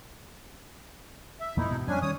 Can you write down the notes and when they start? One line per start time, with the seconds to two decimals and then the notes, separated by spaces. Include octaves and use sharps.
1.40 E5
1.57 E2 A#2 A#3 D#4 E4
1.69 G#2 B2
1.87 F2 G3 C#4 D4 G#5
2.02 D#3 G3 C#4 C#5 D#6